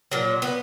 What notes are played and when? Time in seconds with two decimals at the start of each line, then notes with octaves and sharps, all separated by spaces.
0.12 A#2 F#3
0.42 B3